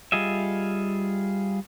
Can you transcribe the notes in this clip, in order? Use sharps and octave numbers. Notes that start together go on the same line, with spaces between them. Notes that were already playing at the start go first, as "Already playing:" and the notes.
G3 F4 G#4 D#5 E5